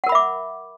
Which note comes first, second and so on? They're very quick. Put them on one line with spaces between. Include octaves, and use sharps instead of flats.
F#5 A#4 B5 E5 D6